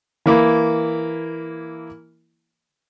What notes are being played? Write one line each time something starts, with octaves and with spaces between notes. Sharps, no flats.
E3 A#3 E4